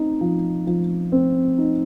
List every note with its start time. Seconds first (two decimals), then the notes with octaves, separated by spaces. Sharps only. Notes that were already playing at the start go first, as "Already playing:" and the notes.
Already playing: C4 D#4
0.21 F3
0.67 F3
1.12 C4
1.58 D#4